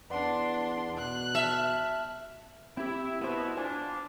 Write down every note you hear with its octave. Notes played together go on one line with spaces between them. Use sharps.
E2 D4 B4 D5 F#5 C6
B2 F#6
E5 A5 F6
C4 E4 G4
B2 B3 E4 C5
D4 F4 C5 G#5